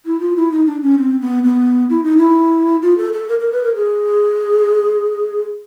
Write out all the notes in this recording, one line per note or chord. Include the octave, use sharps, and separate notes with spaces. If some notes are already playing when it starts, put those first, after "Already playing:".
E4
F4
E4
D#4
D4
C#4
C4
B3
B3
E4
D#4
E4
F4
A4
A4
A#4
A#4
B4
A#4
G#4